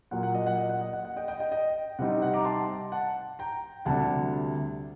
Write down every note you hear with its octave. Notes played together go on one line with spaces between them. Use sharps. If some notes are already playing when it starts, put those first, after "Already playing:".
A#2 F#3 A#3 F#5
F#5
D#5
F#5
D#5
F#5
D#5
F#5
F#5
D#5 G5
D#5 G5
D#5 G5
D#5 G5
C3 G3 C4 D#4 F#5
D#5
F#5
A#5 D6
A5 C6
F#5 A5
G5 A#5
D2 C3 G3 D4 F#5 A5